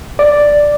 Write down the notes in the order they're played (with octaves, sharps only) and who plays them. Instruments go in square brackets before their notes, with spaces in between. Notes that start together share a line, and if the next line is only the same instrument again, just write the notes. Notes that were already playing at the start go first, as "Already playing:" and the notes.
[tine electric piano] D5